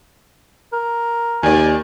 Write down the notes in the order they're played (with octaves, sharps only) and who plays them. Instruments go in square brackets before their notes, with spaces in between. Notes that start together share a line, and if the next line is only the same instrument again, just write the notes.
[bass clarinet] A#4
[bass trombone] D#2 [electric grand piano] D#3 D5 [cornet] G#5